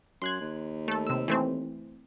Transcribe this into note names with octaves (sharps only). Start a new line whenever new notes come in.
F#2 C6 F#6 G#6
D#2
A3 A4
C3 E6
E3 A3 C4